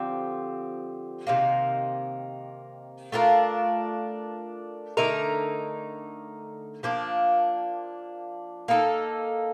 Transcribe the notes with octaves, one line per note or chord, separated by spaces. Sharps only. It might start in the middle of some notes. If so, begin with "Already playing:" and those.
Already playing: D3 F3 C4 G4
C3 D#3 A#3
A3 D4 F4 A#4
D3 A3 D#4 A#4
F3 A#3 D4
A#3 D#4 A4